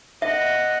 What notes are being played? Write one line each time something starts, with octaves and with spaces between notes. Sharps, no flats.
D#5 E5 F#5